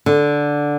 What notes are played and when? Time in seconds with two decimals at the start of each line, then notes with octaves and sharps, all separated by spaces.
0.06 D3